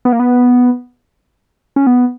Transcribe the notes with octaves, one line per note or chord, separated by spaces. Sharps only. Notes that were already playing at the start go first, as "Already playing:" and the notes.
B3
A#3
B3
C#4
B3